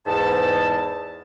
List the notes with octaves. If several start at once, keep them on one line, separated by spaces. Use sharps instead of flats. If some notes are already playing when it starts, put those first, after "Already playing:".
E2 G#2 A5